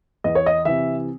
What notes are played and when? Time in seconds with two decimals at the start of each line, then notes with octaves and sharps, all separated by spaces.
0.24 E2 D#5
0.35 C#5
0.46 D#5
0.65 C3 E3 E5